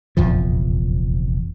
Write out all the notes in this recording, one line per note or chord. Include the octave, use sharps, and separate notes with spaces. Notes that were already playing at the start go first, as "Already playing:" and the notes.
F1 A#1 E2 F3